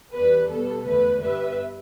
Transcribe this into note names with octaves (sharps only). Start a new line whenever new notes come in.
E2 E3 G3 B3 D4 B4
B2 G3 B3 A4
E2 D3 A3 B4
G2 G3 B3 B4 E5